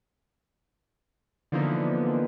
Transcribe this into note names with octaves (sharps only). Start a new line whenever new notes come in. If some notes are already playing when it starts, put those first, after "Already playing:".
D3 E3 F3 A#3 B3 D#4